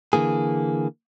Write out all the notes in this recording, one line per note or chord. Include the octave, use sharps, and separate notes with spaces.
D3 E3 A#3 G#4